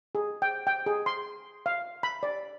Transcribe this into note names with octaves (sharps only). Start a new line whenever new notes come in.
G#4
G5
G5
G#4
C6
F5
B5
D5